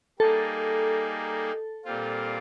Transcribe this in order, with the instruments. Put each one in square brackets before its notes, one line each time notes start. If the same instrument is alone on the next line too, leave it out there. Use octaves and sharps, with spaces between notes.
[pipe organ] G3 A#3 D#4 G#4 [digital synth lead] A4
[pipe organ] A#2 G3 C4 F4